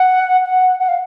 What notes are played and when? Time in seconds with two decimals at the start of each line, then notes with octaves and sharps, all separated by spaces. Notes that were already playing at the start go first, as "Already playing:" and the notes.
Already playing: F#5
0.44 F#5
0.79 F#5
0.88 F5